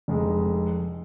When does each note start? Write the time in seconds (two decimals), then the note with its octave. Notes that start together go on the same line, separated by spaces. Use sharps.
0.08 F1 F2 G#3